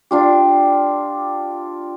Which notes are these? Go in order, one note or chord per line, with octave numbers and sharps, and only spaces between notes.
D4 F4 G4